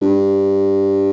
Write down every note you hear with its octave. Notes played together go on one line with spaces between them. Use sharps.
G2